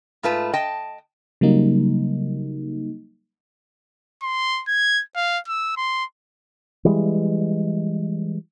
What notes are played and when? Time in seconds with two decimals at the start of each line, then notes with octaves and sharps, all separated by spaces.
0.23 G#2 A3 F4 B4 A5
0.54 D#5 G5 A5
1.41 C#3 F#3 G3 A#3 D#4
4.23 C6
4.68 G#6
5.16 F5
5.48 E6
5.77 C6
6.85 E3 G3 G#3